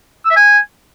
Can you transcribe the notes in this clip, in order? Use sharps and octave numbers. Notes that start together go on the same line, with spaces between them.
E6
E5
G#5